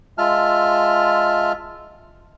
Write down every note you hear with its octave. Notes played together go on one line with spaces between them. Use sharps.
G#3 F4 E5 A5 F6